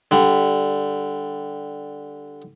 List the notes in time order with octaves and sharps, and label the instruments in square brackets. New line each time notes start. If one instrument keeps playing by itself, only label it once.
[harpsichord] D3 G3